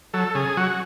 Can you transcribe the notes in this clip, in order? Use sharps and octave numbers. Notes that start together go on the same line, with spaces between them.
F#3 A4
C#3 G#4
F#3 F#4